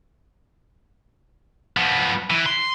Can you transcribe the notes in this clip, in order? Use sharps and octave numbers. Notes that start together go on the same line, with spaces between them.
F3 B3
E3
C6